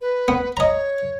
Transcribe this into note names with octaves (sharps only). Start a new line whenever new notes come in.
B4
B3
C#5 D#5 A#5